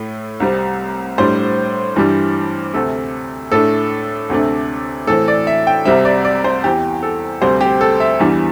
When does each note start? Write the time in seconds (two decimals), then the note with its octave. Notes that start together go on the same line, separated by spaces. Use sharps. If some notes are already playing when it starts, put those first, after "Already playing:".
Already playing: A2 A3
0.40 C2 C3 G3 C4
1.18 A2 G3 D4 C5
1.96 G2 E3 G3 D4
2.74 D2 C3 A3 A4
3.52 A2 A3 D4 A4
4.30 D2 C3 A3 D4
5.07 A2 E3 C4 A4
5.28 D5
5.47 E5
5.67 G5
5.85 C2 C3 G3 C4 E5
6.05 D5
6.25 D5
6.44 C5
6.64 E2 E3 C4 G4
7.03 A4
7.42 D2 C3 G3 C5
7.61 G4
7.81 A4
8.00 E5
8.20 E2 E3 G3 D4